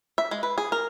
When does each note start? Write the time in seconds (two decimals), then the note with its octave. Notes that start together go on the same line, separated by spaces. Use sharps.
0.18 E5
0.31 G#3
0.43 B4
0.58 G#4
0.72 A#4